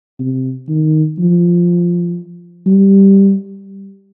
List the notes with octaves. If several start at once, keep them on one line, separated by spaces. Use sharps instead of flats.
C3
D#3
F3
G3